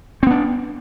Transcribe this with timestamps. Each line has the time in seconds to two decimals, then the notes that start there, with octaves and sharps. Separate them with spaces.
0.23 C4
0.27 B3
0.31 D4